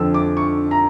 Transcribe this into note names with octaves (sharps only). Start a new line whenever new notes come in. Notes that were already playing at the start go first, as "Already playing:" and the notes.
Already playing: F2 D3 F3 E6
D6
C#6
A#5